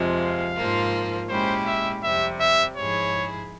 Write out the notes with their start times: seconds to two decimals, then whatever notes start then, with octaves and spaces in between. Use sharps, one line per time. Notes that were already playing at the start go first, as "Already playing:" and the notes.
Already playing: F2 C3 F3 G#3
0.19 F5
0.55 G#2 F3 A#3 F4
1.29 A#2 G#3 C#4 E4 G4 C5
1.66 E5
2.03 F2 C3 G3 E5
2.40 E5
2.76 G#2 F3 G#3 E4 G#4 C#5